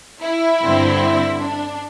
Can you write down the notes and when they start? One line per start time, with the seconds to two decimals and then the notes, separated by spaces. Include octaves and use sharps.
0.22 E4
0.62 G2 D3 C4
1.41 D4